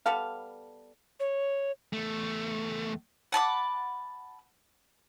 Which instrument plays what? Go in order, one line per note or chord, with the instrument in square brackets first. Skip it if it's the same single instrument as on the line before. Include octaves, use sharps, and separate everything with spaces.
[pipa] G3 B3 A4 F5
[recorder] C#5
[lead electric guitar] E2 A3
[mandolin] F#5 A5 B5 D6